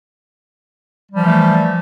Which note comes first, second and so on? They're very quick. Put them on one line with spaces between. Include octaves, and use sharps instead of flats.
G3 F3 E3 A3